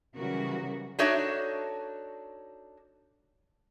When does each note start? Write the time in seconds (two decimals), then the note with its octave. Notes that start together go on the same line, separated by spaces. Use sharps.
0.16 C#3 E3 F#3 G3 F#4 A#4
0.99 D4 D#4 F#4 A4 C#5 E5